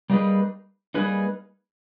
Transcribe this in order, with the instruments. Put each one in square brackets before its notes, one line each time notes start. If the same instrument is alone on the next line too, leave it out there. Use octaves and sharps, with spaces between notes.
[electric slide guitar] G3 A#3 D#4 G#4 B4
G3 A#3 D#4 G#4 B4